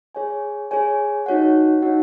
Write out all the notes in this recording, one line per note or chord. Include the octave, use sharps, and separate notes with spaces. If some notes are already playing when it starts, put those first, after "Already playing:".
G#4 C#5 G#5
G#4 C#5 G#5
D#4 F#4 C#5 F#5
D#4 F#4 C#5 F#5